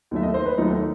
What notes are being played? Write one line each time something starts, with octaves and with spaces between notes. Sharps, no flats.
D#2 D#3 F#3 A3 E5
D#5
C5
B4
D#2 D#3 F#3 A3 D#4